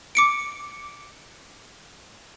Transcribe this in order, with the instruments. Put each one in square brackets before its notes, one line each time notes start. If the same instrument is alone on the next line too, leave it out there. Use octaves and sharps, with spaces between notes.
[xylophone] D6 C#7 D7